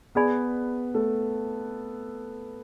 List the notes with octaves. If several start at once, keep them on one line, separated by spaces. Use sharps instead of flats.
B3 G#4 B4 D5 G#5 B5
A3 A4